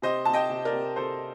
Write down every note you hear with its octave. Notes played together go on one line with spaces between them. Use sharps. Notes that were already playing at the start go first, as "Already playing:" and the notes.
C3 C5 D#5
C3 A5
D#5 G5
C3
A#4 D5
C3
C3 A4 C5